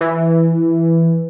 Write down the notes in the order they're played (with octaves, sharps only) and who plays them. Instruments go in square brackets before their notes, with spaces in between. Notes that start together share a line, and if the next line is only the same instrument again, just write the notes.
[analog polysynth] E3